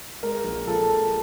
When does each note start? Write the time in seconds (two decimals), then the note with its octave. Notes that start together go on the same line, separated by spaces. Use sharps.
0.23 G#3 A#4
0.44 A#1
0.67 F3 A4
0.88 F3